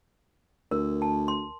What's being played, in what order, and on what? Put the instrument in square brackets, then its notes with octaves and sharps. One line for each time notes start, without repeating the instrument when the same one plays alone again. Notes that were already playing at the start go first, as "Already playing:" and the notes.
[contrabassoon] D2 [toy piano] A#4
[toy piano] A5
C6